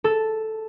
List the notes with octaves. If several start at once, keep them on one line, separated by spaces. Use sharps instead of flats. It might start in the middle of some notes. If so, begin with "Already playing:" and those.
A4